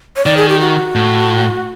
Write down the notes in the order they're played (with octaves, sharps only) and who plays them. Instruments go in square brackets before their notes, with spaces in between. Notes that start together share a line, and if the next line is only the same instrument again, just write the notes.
[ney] C#5
[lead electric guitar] D#3 [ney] D5
[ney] G#4
G4
F#4
[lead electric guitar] A2